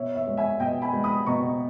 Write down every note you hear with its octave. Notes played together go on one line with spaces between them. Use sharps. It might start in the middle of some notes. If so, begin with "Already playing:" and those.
Already playing: B2 C#5 E5
C#5 E5
G#3
E5 G#5
B2 D#5 G5
G#5 B5
G#3
B5 D#6
B2 A#5 C#6